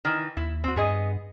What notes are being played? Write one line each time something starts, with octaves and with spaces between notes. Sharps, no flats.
D#3 E3
D#2 E4
C4 F#4
G2 B3 G#4 D#5